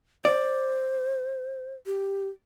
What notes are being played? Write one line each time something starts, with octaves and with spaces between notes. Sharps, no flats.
C5 D5
G4